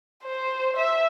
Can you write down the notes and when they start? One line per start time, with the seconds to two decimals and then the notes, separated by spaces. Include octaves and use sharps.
0.24 C5
0.77 E5